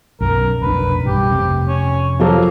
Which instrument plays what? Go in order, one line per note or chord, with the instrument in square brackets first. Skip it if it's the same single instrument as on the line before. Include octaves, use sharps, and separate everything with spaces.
[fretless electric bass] B1 F#2 [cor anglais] A#4
[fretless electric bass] F1 B1 D4 [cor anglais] B4
[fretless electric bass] B1 G2 [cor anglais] G4
[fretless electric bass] F1 C3
[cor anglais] C#4
[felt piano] F3 F#3 A4 [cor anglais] A#3